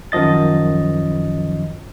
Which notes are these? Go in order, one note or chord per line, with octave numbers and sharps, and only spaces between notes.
F#2 D#3 F3 D#5 A6